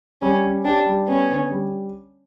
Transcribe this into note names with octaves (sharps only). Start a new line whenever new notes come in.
G3 C#4
C#4
D4 G4
G3
B3 C#4
D3
G3